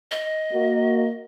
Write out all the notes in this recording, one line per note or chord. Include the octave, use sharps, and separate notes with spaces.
D#5
A#3 F#4